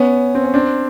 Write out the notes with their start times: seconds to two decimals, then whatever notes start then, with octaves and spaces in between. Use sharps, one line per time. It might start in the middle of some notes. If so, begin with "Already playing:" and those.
Already playing: B3 C#4
0.35 C4
0.44 C#4
0.54 C4 D4